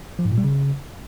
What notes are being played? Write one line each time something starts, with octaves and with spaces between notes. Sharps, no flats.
F3
G#2
A#2
G3
C#3